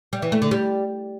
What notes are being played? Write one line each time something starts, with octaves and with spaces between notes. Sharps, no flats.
G3
E3
A3
D3
G3